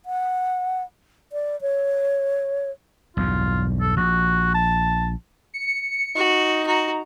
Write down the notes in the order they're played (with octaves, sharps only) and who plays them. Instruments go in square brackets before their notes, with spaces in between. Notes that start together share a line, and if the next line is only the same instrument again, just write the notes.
[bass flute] F#5
D5
C#5
[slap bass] B1 E2 G2 [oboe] F4
[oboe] A4
[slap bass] A#1 [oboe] F#4
[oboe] A5
[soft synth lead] C#7
[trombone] D#4 [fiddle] F#4
[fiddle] F#4 [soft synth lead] A#5